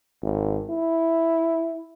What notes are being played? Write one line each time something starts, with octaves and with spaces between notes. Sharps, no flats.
G#1
E4